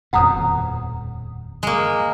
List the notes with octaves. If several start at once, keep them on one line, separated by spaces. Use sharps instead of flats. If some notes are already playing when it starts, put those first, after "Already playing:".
D#1 F2 B2 F#5 A#5 D#6
G#3 A#3